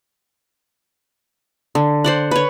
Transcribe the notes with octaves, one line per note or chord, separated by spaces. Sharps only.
D3
C5 D5 F#5
B4 C#5